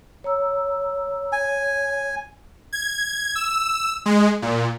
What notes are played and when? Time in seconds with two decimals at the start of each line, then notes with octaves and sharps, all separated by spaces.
0.24 C#5 A#5 E6
1.32 C#5 G#5
2.73 G#6
3.35 E6
4.06 G#3
4.42 A#2